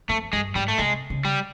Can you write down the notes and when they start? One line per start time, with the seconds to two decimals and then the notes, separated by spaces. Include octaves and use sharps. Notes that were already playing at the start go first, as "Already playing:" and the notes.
0.09 F2 A3
0.33 G2 G#3
0.55 G#2 G3
0.68 A3
0.78 C3 G#3
1.10 C#3
1.25 G3